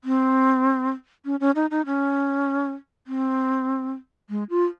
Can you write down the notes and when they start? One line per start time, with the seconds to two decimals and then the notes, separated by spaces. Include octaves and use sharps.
0.04 C4
1.25 C#4
1.40 C#4
1.56 D#4
1.71 D#4
1.86 C#4
3.07 C4
4.30 G#3
4.50 F4